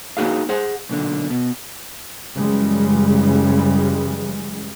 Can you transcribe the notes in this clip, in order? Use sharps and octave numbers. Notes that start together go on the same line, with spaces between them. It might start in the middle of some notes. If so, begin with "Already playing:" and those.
A#3 D#4 F#4 G#4 F5
G#4 C5 F#5
B1 A#2 D3
B2
F#2 C#3 E3 G3 G#3